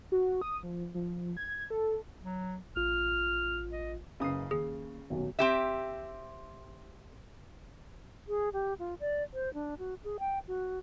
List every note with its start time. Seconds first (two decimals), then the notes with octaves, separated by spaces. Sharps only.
0.12 F#4
0.41 D#6
0.63 F3
0.94 F3
1.37 G#6
1.70 A4
2.23 F#3
2.76 A1 F4 F6
3.72 D#5
4.20 F#1 C#3 B4 D#6 C7
4.51 D#2 G#4
5.10 D#1 B1 F#3
5.39 C4 G4 E5
8.28 G#4
8.53 G4
8.79 F4
9.00 D5
9.34 C5
9.54 D4
9.78 F#4
10.04 G#4
10.19 G5
10.48 F#4